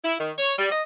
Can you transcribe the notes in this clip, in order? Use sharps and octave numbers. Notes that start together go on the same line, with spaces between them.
E4
D#3
C#5
G3
D#5